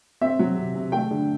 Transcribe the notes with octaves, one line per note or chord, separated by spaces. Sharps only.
C4 E5
F#3
C3
C3
A3 G5
D3